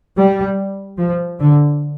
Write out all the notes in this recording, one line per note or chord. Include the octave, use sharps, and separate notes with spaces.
G3
F3
D3